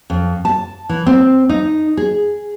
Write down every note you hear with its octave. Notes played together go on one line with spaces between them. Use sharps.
F2
A5
E3
C4
D#4
G#4